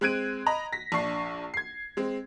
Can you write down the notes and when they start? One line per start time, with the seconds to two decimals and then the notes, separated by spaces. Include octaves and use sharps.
0.01 G#3 C4 F#6 G#6 D7 D#7
0.46 D#5 A#5 B5
0.73 A#6 B6
0.92 A#1 D4 C#6 C7
1.54 G#6 C7
1.97 G#3 C4